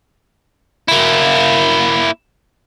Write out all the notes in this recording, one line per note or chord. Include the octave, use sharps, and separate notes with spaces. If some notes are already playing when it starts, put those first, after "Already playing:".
A#3 E4